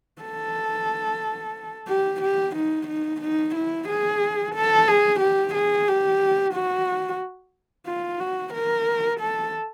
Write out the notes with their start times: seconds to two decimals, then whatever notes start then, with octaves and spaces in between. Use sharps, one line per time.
0.22 A4
1.88 G4
2.22 G4
2.56 D#4
2.88 D#4
3.22 D#4
3.55 E4
3.89 G#4
4.55 A4
4.88 G#4
5.20 G4
5.55 G#4
5.88 G4
6.54 F#4
7.87 F4
8.20 F#4
8.54 A#4
9.20 A4